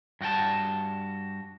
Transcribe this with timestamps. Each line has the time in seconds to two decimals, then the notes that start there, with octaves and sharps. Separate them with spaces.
0.21 G2 F#4 G5 A5